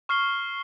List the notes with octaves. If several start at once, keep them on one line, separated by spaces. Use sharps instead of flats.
C#6 F6 C7 G7